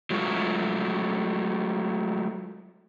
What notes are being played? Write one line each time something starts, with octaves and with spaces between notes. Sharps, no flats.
F#3 G#3 A3 F4 F#4